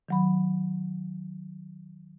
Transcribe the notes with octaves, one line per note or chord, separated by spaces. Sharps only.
D#3 F#3 B5